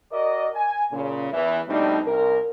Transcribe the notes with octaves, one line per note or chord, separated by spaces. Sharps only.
F#4 A#4 D5 D#5
G#5
A#2 C#3
E2 E3
B2 G3 A3 C4 D4 D#4
C2 A#4